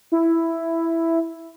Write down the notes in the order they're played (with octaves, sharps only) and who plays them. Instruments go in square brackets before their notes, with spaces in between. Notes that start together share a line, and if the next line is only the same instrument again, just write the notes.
[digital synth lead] E4